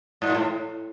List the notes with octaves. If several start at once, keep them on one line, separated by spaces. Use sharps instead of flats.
G#2
A#2
A2